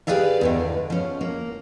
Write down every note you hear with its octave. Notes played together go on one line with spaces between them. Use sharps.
G4 G#4 B4 D5 E5 F5
E2 D3 D#3
F3 C#4
A#3